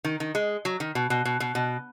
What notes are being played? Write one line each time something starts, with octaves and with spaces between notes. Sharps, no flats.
D#3
D#3
G#3
F#3
D#3
B2
B2
B2
B2
B2